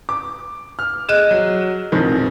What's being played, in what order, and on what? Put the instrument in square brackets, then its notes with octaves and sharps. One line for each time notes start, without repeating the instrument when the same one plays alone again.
[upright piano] D6
F6
[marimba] G#4 D#5 F#6 [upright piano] E7
[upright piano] F#3
A#1 F2 D#3